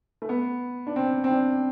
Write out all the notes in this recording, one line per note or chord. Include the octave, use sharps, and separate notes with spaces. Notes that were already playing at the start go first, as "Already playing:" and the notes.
A3
B3
D4
C4
C4
D4